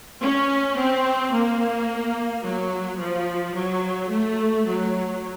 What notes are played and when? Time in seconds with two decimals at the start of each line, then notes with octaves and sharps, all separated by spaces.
0.22 C#4
0.77 C4
1.33 A#3
2.44 F#3
2.99 F3
3.55 F#3
4.10 A3
4.67 F#3